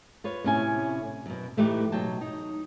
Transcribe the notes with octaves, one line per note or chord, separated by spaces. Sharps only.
F4 B4 C#5
A2 C3 C#4 E4 G#5
F#2 B2
A2 E3 A3 D#4 G4 B4
B2 F#3 G5 A5
D#4